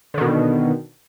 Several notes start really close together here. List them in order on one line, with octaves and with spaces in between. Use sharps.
D3 D#3 B2